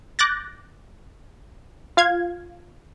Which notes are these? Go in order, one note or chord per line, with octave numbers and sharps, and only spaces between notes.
D6 F#6 G6 A6 A#6
F4 F5 G#6